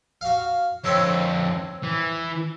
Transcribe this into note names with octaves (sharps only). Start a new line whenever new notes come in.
F#4 F5
F2 D3 C4 A4 C#5
E3